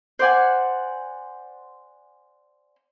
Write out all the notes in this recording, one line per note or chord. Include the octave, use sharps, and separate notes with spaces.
C5 D5 F#5 G#5